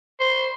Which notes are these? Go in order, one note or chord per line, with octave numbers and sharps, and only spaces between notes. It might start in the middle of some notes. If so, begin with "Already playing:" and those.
C5